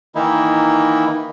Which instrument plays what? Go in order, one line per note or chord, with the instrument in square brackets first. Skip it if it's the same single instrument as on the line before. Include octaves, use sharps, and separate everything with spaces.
[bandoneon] D#3 E3 A#3 D#4 E4